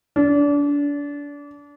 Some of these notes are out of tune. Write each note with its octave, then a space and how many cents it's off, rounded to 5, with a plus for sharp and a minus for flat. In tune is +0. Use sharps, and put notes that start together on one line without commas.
D4 -30